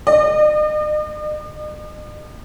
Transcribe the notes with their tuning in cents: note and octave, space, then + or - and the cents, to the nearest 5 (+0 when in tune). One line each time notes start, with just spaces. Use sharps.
D#5 -45